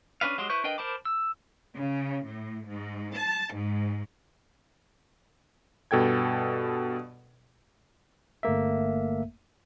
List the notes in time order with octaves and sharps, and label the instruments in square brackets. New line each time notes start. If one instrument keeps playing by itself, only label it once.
[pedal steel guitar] C#4 D4 B4 F5
F#3 G#3 G4 C6
E4 B4 C5 C#6 G6
D4 A#4 B4 D#5 G5
A#4 C5 A5 B5 D6
E6
[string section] C#3
A2
G#2
A5
G#2
[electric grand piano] G2 B2 A4 G5 G#6
[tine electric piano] G1 A3 A#3 E5